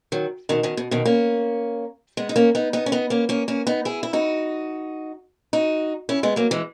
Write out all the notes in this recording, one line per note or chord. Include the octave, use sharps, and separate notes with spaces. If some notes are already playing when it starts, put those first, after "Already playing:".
D#3 F#3
B2 D#3
B2 D#3
B2
B2 D#3
A#3 C#4
G#3 B3
D#4
A#3 C#4
B3 D#4
B3 D#4
C#4
B3 D#4
A#3 C#4
A#3 C#4
A#3 C#4
B3 D#4
E4 G#4
E4
D#4 F#4
D#4 F#4
C#4 E4
G#3 B3
F#3 A#3
E3 G#3